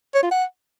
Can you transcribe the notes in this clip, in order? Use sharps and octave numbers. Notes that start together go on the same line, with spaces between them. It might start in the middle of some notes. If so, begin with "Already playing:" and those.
C#5
F4
F#5